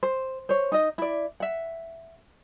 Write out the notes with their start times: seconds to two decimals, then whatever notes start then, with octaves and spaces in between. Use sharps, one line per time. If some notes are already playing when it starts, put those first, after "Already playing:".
0.03 C5
0.49 C5 C#5
0.72 D#4 D#5
0.98 E4 D5
1.40 E5 F#5